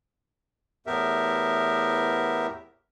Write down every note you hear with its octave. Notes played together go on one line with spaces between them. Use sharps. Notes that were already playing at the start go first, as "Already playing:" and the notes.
E2 A2 B3 G4 A#4 E5